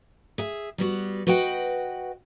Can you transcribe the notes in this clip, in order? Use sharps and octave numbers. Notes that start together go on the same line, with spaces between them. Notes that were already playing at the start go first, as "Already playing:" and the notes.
G#4 E5
G3 B3 F#4
F#4 B4 D#5 F#5 G5